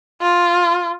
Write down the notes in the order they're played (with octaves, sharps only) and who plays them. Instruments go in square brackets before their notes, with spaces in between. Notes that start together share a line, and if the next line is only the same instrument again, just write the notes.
[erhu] F4